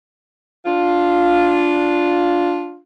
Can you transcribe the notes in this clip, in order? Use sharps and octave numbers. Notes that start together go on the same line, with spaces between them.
D4 F4